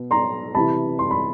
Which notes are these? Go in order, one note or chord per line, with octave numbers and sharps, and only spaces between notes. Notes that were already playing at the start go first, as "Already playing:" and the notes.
Already playing: B2
A#5 C6
C3 E3 A5 B5
C6
B5